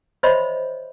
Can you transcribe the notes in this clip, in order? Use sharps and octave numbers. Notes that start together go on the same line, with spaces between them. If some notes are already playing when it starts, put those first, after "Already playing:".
C5 C#5 D#5 E5 B5 C6